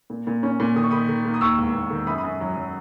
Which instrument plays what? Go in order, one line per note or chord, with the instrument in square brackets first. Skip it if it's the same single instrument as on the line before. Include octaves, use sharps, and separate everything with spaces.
[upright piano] A#2
A#2
C#4
A#2
D#3 D#6
C#6
D#3 B5 D#6
D#3
A#3
D#6
D#2 C#6 E6
E1
D#2
D#3
F#2 B5 D#6
B5 D#6
F#2
F#3
F#3